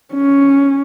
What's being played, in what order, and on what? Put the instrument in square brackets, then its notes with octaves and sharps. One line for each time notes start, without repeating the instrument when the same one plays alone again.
[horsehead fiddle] C#4